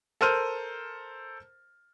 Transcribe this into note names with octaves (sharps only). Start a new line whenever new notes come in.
A4 A#4 C5 F6 D#7